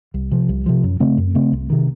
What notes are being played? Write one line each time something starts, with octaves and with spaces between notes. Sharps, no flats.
C2
C3 F3
C2
C3 F3
F#2
C#3 A3 C4
F#2
C#3 A3 C4
C2
C3 D#3